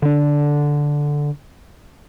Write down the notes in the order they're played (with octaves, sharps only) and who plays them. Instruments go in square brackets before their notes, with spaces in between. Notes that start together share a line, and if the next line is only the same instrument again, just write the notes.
[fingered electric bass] D3 D4